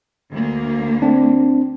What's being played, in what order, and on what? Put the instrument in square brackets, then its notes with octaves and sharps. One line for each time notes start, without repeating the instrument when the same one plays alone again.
[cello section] D2 A#3
[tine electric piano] C4 D4